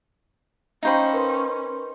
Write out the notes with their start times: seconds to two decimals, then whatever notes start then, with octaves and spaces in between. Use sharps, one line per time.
0.83 C#4 D#4 C5 D#5 F5 G5 B5
1.13 A#4 B4 C6